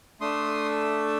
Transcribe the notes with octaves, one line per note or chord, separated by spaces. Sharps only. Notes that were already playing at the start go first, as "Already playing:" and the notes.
A3 D4 A4 C6 D#6